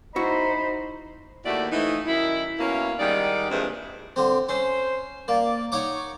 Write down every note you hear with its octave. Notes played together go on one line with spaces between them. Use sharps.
D#4 E4 F#4 C5 B5
D#2 A3 E4 F#4 D5
E3 F3 A3 D#4
F#2 D#3 E4
B2 A#3 C#4 E4
G#2 D#3 G3 D#4 D5
G2 A#2 E3 G#3 C4
D3 C4
C#4 C5
A#3 D5
D#4 C#5 F#5 D6